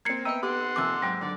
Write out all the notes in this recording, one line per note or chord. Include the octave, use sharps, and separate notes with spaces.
A#3 C4 G#6 C7 C#7
B3 B4 D#5 E5 G5 A#5 E6
G4 F#5 C6 D6
C3 F3 A#3 G#5 D6 E6
G#2 F#3 G5
D3 D5